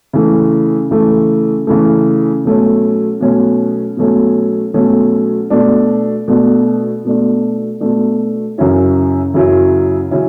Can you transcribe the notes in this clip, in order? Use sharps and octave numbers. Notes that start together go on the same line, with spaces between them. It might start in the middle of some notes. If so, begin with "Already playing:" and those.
C#3 E3 A3
C#3 E3 A3
C#3 E3 A3
B2 F#3 A3 C#4
B2 F#3 A3 C#4
B2 F#3 A3 C#4
B2 F#3 A3 C#4
B2 A3 D4
B2 A3 D4
B2 A3 D4
B2 A3 D4
F#2 C#3 F#3 C#4 E4
F#2 C#3 F#3 C#4 E4
C#3 F#3 C#4 E4